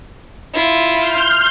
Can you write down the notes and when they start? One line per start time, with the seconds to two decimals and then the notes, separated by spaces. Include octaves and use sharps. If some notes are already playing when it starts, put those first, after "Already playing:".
0.54 E4 F4
0.97 C6 F6 G6